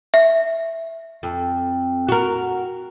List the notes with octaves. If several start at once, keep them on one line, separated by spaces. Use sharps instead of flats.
E5
F2
F#4 A#4